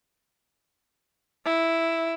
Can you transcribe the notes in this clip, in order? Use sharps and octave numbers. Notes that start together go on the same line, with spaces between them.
E4